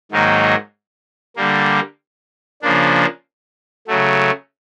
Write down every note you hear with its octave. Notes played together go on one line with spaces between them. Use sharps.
G#2 D#3 F#3 A#3 D#4
D3 G3 A#3
C#3 F3 A#3 D4
C#3 F#3 A3